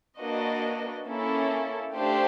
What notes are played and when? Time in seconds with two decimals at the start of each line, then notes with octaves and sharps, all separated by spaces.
0.19 A#3 D4 F#4 B4 D#5
1.07 A#3 C#4 E4 A4
1.95 A3 D4 G4 C5 F5